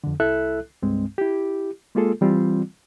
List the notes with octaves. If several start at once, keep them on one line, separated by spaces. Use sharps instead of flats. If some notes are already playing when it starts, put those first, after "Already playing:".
F2 D3
C2 E4 A4 E5 F#6
C2 G2 G#3 C4
E4 G4
G#3 A#3 F4 G#4 A4
E3 G3 C4 F4